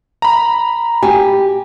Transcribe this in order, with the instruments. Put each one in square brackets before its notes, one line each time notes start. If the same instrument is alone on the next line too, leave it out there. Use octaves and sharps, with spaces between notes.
[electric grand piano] A#5 B5
[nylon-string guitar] G4 [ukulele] G#5